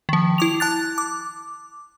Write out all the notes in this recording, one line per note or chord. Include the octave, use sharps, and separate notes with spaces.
D#3 F3
E4 D6 F7
A5 F#6 A6
D6